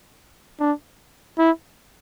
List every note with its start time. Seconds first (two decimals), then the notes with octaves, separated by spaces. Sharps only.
0.60 D4
1.38 E4